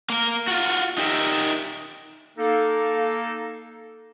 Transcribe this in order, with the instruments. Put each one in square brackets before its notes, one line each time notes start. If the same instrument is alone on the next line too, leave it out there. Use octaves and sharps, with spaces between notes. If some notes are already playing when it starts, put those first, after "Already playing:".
[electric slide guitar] A#3 A#4
F4 F#4
D#4 G4 A#4 E5
[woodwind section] A#3 D#4 A4